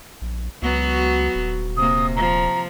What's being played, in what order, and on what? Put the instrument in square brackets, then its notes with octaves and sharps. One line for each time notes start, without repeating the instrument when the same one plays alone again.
[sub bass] A#1
[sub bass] C#2 [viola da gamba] F#3 B3 F#4
[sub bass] D#1
[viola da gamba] C3 A#3 [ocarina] D#6
[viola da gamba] F3 [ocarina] A#5